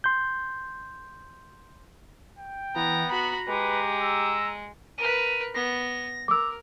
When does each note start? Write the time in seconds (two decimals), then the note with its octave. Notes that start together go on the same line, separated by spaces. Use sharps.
0.04 C6 G6
2.38 G5
2.76 E3 B3 A#5
3.11 F#4 A#5 B5
3.48 G#3 G4 B4
4.01 E6
4.98 A#4 B4 D#7
5.54 B3 A#6
6.28 A#4 D6 E6